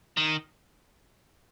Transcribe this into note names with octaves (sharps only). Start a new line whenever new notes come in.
D#3